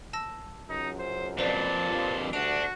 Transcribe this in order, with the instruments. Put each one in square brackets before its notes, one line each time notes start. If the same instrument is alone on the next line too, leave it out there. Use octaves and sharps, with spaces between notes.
[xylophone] A5 E6 A#6
[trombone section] C#2 F#2 [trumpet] D#4
[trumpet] C5
[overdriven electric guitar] F2 A#2 [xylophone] B4 C5 D5 [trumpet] A5
[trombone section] G2 F3
[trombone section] D2 G2 [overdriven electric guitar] D4 [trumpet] F#4 [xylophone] D7 F7